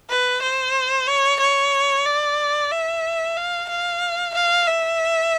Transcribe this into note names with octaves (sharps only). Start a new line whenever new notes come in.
B4
C5
C#5
C#5
D5
E5
F5
F5
F5
E5